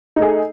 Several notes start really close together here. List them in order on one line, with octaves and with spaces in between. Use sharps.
D#4 A3 G#4